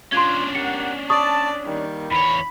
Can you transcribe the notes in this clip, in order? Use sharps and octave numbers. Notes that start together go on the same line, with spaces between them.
C#4 D4 F4 C6 G#6
G4 A#4 F#5 C#7
D5 A5 C#6 D#6
D#3 G3 A#3
E2 C#5 B5